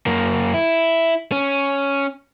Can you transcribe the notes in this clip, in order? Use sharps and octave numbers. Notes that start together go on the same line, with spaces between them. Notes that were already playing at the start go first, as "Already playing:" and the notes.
F#2 A#3
E4
C#4